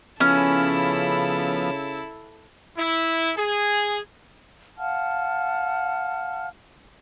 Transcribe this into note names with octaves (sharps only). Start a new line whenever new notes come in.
C#3 F3 B3 C#4 E4 A4
E4
G#4
F5 F#5 A5 F6